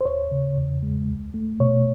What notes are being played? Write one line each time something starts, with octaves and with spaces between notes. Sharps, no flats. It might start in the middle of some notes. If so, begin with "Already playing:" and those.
C5
D#2 C#5
C#3
E2
G#3
C#2
A3
B2 C#5